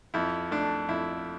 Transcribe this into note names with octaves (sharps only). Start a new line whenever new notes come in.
F2 E4
A3 D4
F2 E4